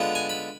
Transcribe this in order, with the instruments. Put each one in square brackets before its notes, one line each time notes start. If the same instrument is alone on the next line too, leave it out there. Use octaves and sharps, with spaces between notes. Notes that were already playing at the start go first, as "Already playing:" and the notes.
Already playing: [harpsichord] D3 G#3 B3 F4
G#5
B5